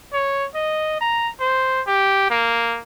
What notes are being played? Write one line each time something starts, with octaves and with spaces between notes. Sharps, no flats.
C#5
D#5
A#5
C5
G4
A#3